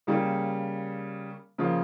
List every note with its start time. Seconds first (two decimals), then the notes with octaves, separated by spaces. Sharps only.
0.07 C#3 G3 A#3
1.58 C#3 F3 A#3 F4